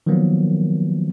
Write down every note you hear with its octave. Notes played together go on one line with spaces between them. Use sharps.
D#3 F3 F#3 A#3 B3